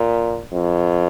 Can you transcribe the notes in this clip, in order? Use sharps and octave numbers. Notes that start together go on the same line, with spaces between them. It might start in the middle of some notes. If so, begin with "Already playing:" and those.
Already playing: A#2
F2